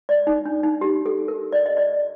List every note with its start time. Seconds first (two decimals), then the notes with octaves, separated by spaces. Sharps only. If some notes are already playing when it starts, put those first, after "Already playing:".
0.09 D5
0.27 D#4
0.46 D4
0.64 D#4
0.81 G4
1.06 A4
1.28 A#4
1.52 D5
1.66 D#5
1.77 D5